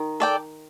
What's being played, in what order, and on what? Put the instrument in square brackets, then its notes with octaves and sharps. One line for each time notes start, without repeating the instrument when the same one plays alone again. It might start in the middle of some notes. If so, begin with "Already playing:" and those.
Already playing: [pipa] D#3
[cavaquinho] A4 D5 G5